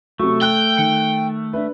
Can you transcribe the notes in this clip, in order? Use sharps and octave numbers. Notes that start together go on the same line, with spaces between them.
C3 F#3 A3 C#6
G5 F#6 G7
D#3 C#7 F#7
D4 B4 E5